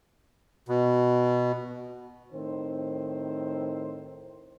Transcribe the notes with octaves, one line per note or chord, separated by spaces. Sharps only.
B2
A2 D#3 C4 C5